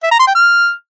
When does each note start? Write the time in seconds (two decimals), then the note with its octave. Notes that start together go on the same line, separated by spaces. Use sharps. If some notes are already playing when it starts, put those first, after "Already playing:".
0.04 E5
0.11 A#5
0.19 C6
0.27 G5
0.35 F6